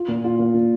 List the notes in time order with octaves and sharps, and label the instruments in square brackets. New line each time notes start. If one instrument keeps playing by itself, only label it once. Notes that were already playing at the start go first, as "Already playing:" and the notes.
Already playing: [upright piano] F4
A#2
F4
A#2
A#2